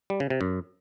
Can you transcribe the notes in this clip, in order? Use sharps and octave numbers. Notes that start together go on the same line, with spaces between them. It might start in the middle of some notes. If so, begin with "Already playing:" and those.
G3
C#3
C3
F#2